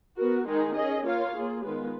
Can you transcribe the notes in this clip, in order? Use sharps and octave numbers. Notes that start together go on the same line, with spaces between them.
B3 F#4 A#4
D#3 G#3 D#4 G#4
C#4 G#4 D#5
A#3 F4 A#4 C#5 F5
A#3 F4 G#4
D#3 G#3 B3 F4 B4